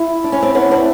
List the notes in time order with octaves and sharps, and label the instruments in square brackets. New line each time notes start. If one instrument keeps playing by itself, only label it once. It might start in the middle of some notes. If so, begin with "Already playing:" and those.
Already playing: [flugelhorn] E4
[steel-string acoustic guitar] D4
C#4
C4 D4
B3 C#4
C4 D4